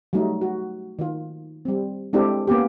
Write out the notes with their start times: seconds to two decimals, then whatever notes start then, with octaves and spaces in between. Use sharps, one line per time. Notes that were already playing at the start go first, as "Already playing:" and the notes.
0.13 F#3 G3 A3 D#4
0.41 F#4
0.99 D#3 F4
1.65 G3 C4
2.13 G#3 C4 D4 E4 G4 A4
2.47 A#3 B3 C#4 G4